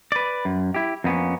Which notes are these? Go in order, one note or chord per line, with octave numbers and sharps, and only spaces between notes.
B4 D5
F#2
E4 G4
F2 A#3 B3 C#4